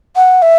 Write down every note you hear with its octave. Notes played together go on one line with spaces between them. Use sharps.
F#5
E5